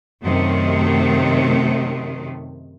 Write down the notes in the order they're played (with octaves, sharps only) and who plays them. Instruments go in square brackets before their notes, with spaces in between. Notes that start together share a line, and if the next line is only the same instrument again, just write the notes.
[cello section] F#2 C3 D#3 A3